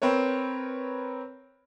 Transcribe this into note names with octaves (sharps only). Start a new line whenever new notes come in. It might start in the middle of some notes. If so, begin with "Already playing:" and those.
C4 A#4 B4 C#5